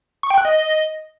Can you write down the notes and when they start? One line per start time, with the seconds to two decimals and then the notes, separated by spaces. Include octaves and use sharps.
0.23 C#6
0.30 G5
0.38 F#6
0.45 D#5